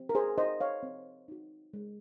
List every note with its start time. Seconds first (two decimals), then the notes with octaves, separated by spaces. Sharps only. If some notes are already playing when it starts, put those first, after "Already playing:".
Already playing: C4
0.09 A#4
0.15 G#4 C5
0.37 D#4 C5 D#5
0.43 F#4
0.60 C#5 F5
0.83 C4
1.28 D#4 F#4
1.74 G#3